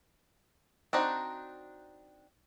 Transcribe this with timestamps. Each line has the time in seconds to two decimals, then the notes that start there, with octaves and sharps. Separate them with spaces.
0.93 C4 D4 D#4 F#4